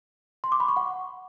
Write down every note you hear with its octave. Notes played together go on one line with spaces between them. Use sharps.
C6
D6
B5
C#6
F#5